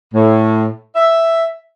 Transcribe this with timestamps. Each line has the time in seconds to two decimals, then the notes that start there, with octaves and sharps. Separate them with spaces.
0.14 A2
0.96 E5